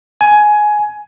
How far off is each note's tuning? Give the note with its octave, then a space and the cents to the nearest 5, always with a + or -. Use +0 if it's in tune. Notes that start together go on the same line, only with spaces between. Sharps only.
G#5 +15